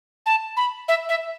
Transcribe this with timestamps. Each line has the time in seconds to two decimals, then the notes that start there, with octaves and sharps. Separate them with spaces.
0.26 A5
0.57 B5
0.88 E5
1.09 E5